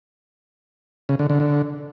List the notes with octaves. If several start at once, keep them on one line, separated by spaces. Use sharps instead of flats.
C#3
D3
D3
D3